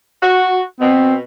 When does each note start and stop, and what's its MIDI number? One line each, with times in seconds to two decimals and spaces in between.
0.22 0.61 66
0.80 1.22 47
0.80 1.15 60